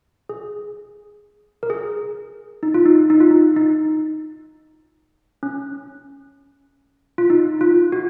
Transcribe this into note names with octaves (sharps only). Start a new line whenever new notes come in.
G#4
A#4
G#4
D#4
F4
D#4
D#4
F4
D#4
D#4
C#4
F4
D#4
F4
F#4